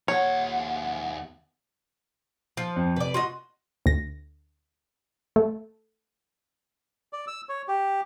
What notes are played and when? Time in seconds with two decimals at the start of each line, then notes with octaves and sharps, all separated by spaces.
0.08 D#2 C#5 F#5
2.57 F3 C7
2.76 F2
2.96 F1 B4 D5
3.14 F4 F#4 D#5
3.86 D2 A#6
5.36 A3
7.13 D5
7.27 E6
7.49 C#5
7.68 G4